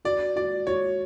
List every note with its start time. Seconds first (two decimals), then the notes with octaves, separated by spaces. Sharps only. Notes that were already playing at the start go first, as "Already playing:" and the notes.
0.05 F#4 D5
0.36 F#4 D5
0.67 F#4 C#5